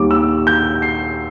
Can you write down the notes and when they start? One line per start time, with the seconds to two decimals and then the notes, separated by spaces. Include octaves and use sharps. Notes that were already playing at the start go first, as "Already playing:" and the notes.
Already playing: D#2 D#3 G3 C#6 D6
0.11 E6
0.47 G6
0.82 C7